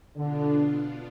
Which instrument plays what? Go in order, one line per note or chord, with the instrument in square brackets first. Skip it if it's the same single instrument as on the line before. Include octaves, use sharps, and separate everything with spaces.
[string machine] B2 B3 D4 F4 [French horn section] D3